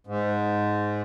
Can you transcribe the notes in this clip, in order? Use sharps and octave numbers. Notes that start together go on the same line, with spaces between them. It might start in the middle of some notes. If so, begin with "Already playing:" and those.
G#2